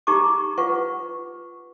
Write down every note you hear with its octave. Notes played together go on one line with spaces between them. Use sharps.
D#4 G4 A#5 C#6 D6
F4 B4 F#5 C#6